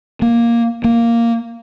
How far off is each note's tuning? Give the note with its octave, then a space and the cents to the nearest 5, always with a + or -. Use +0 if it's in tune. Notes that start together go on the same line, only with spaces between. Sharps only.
A#3 +5
A#3 -5